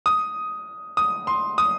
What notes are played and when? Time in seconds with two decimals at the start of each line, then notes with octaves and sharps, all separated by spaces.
0.06 D#6
0.97 D#6
1.27 C6
1.58 D#6